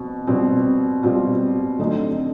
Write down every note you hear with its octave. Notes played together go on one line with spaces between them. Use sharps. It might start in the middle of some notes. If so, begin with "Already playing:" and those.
Already playing: B2 C4
B2 G3 C4 F4
B2 G3 C4 F4
D3 F#3 A3 C4 D#4